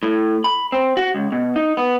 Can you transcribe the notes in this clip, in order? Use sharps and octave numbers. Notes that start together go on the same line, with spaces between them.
A2
B5
C4
F#4
C#2
B2
D#4
B3